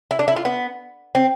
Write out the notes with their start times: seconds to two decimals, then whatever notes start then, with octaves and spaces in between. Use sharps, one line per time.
0.11 E4
0.19 D4
0.28 E4
0.36 F4
0.45 B3
1.15 C4